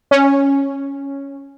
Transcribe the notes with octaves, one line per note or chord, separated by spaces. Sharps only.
C#4